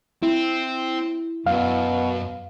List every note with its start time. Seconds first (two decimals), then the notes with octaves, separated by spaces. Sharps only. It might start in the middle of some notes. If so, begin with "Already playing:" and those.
0.23 C4 E4
1.46 F#2 B2 F5